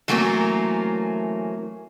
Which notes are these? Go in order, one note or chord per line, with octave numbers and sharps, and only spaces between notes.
E3 F#3 A3 A#3 C4 C#4